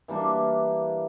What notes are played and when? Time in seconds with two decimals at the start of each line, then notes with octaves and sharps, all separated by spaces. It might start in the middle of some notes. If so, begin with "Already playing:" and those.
0.08 E3 G3 A#3 D4